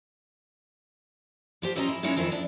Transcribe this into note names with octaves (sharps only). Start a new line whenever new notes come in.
F3 G4 C5 G5
C4 C#4 E4 F4 D#5 A#5
E4
G#3 C#4 D#4 E4 F#4
F2 D#3 F3 C4 E4
D4